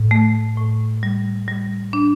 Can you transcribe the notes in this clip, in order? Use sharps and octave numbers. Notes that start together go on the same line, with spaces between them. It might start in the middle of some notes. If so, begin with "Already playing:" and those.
Already playing: A2
A3
A2
G3
G3
D4